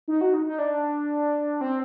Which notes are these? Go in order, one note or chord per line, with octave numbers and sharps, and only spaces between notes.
D#4
F#4
D#4
D#4
D4
C4